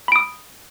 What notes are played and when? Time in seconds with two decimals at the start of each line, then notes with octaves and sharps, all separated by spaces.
0.08 B5
0.12 D7
0.16 D#6